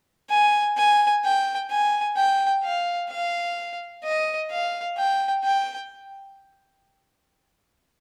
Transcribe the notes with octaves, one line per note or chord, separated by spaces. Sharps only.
G#5
G#5
G5
G#5
G5
F5
F5
D#5
F5
G5
G5